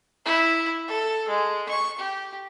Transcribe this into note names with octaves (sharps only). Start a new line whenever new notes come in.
E4
A4
G#3
C#6
G4